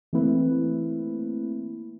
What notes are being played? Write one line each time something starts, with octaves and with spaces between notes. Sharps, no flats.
E3 A3 A#3 C4 E4 B4